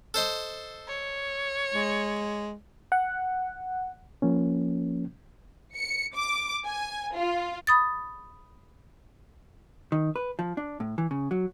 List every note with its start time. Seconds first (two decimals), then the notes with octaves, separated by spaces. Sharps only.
0.14 A4 C5 D#5
0.88 C#5
1.74 G#3
2.92 F#5
4.22 F3 A#3 C#4
5.75 C#7
6.15 D6
6.65 G#5
7.16 F4
7.67 B5 D#6 A6
9.92 D#3
10.16 B4
10.39 F3
10.57 D4
10.80 A2
10.98 E3
11.11 C#3
11.31 F#3